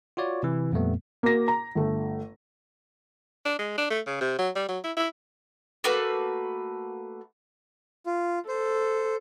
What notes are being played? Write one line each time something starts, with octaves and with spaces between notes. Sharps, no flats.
F4 F#4 C#5 D5
C3 E3
F2 A#2 G3 A3 B3
A#3 F#4 A#4 A#6
A#5
G1 A3
D4
G#3
D4
A3
C#3
C3
F#3
G3
F#3
E4
E4
A3 A#3 F#4 B4
F4
A4 C5